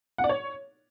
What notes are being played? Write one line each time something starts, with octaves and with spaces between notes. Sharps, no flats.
F#5
D5
C#5